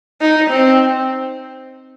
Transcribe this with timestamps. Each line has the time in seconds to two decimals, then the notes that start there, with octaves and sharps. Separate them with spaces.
0.21 D#4
0.51 C4